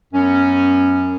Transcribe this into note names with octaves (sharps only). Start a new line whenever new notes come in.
F#2 F#3 B3 C#4